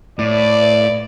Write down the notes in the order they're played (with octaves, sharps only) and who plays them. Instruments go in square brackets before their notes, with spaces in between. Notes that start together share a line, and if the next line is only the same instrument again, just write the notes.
[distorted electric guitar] A2 [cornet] D5